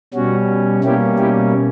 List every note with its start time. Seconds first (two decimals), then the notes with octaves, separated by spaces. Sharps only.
0.14 B2 G3 C#4 F#4
0.84 B2 G3 A#3 C#4 E4 G4
1.19 E4 G4